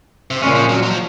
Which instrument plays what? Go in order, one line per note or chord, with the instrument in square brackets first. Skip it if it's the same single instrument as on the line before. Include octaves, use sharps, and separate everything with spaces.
[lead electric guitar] C3
[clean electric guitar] A#2 G#3 C#4 [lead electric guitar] C#3
[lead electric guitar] F3
F#3
F#3
F3